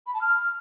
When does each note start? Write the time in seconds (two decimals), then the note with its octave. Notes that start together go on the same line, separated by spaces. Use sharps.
0.07 B5
0.14 A5
0.21 F6